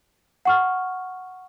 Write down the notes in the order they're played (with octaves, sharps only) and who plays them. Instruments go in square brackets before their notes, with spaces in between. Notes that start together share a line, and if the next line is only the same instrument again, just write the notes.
[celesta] F#5 C#6 F6